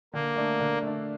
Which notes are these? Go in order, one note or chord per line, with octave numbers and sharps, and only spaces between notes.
D3 A#3
A3 D4
D3
A3 D4